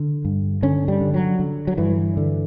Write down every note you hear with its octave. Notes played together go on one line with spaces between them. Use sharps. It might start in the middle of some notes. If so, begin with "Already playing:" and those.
Already playing: D3
G2
D3 C#4
G3
D3
F#3
D3
F#3
G2 E3
D3